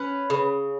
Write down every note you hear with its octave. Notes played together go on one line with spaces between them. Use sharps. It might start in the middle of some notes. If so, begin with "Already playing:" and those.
Already playing: C#4 B4
C#3